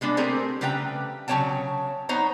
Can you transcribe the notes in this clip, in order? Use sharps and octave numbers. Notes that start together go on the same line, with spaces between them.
G3 G#3 B3 D4
A3 C4 G4 G#4 A#4 C5
C#3 G3 A3 B4 G5 A#5
C#3 F#3 F4 C#5 G5 A5
B3 D#4 C5 C#5 A#5